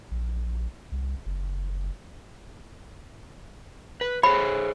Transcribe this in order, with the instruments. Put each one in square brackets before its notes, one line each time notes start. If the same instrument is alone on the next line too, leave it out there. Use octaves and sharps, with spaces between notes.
[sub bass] A#1
C2
F#1
[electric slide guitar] B4
[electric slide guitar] G#4 C5 C#5 [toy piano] B5